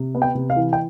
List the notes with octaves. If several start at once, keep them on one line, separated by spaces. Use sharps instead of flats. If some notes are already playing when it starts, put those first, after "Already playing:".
Already playing: C3
B3
G5
C3
F5
E3
G5